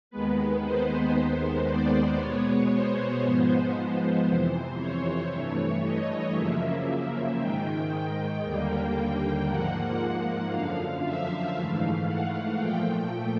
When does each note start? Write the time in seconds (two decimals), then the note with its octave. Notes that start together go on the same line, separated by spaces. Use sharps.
0.11 D#2 D#3 G#3 B3 B4
0.63 C5
1.16 D#2 D#3 G#3 B3
1.68 D5
2.18 B2 G#3 B3 C#5
2.72 C5
3.22 G#2 F3 G#3 B3
3.76 C5
4.26 F2 C3 E3
4.79 C#5
5.31 G2 E3 A3
5.83 D#5
6.35 F#2 C#3 F3 A#3 E5
7.39 G#2 D#3 G#3 G5
7.91 G5
8.42 D#2 D3 G3 A#3 G5
9.47 G#2 F3 A#3 F#5
10.50 F#2 D3 F3 F5
11.03 E5
11.55 G#2 E3 A3 F5
12.07 F#5
12.58 A#2 F3 A3 G5